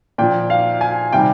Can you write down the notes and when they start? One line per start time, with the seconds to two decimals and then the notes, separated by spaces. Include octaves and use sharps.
0.18 A#2 F3 G5
0.50 F5
0.81 G#5
1.12 C3 D#3 G3 G5